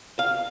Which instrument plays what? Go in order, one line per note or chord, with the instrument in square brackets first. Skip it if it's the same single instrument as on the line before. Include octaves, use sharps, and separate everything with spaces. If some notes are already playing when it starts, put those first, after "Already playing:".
[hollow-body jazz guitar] F5